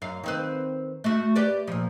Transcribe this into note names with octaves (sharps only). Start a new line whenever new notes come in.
F#2 F5
D#3 C4 B4
A3 F#4
G4 B4 D5
A#2 F3